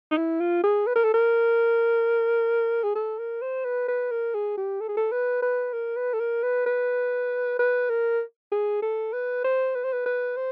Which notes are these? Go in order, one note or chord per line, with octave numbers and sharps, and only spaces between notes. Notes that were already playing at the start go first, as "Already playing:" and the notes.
D#4
E4
F4
G#4
B4
A#4
A4
A#4
G#4
A4
A#4
C5
B4
B4
A#4
G#4
G4
A4
G#4
A4
B4
B4
A#4
B4
A4
A#4
B4
B4
B4
A#4
G#4
A4
B4
C5
B4
C5
B4
B4
C5